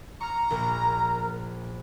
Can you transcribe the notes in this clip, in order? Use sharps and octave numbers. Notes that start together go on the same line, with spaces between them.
A#5 C#6 F6
A#1 A#4